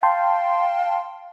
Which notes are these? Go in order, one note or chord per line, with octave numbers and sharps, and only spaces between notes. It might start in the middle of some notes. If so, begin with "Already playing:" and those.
F5 G5 A5 C6